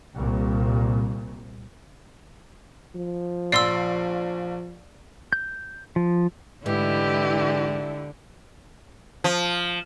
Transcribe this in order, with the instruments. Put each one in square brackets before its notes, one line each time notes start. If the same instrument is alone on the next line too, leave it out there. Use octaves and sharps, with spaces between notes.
[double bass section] C2 A#2
[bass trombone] F3
[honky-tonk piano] A#1 C7 [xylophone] D5 C6 E6
[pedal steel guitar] G6
F3
[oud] G#2 E3 [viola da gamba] D3 [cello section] G#3 E4 [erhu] G4
[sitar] F3